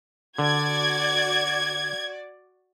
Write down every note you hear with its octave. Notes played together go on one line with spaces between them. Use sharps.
D3 F#4 D5 G#6